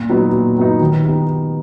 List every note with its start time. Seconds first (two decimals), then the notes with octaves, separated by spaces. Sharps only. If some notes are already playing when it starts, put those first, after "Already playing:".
Already playing: A#2
0.09 F#3 B3 D#4
0.33 A#2
0.57 F#3 B3 D#4
0.80 D#3
1.04 B3 D#4 G4